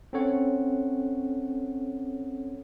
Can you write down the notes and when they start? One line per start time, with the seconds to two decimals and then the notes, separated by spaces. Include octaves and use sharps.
0.13 C4 C#4 A4 C#5 F#5